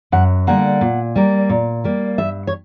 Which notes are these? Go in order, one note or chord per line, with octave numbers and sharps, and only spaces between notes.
F#2 F#5
D3 G3 A#3 F#5
A#2
G3 A#3
A#2
G3 A#3
G2 E5
C#5